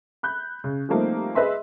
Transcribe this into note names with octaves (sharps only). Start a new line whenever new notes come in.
B5 F#6 G6
C#3
F3 G3 A3 A#3 C4 D#4
G#4 B4 D#5 E5 C6